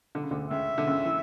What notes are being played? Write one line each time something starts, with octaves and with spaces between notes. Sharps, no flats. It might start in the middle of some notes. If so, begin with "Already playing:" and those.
D3
C#3
D2 D3
C#2 C#3 E5
D3
C#2 C#3
E3